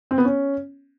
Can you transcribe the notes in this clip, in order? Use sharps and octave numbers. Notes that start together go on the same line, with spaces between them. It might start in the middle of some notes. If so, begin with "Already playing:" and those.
C4
B3
C#4